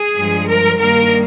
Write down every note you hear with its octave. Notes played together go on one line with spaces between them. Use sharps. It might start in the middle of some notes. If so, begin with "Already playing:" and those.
Already playing: G#4
G2 F3 G#3
A#4
G2 D#3 G3 A#3 A#4